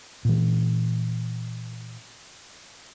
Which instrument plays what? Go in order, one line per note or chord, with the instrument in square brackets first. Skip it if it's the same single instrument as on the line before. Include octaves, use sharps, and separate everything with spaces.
[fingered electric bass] A#2 E3